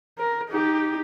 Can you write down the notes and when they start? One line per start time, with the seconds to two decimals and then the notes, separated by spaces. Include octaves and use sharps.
0.18 A#4
0.50 D#4 G4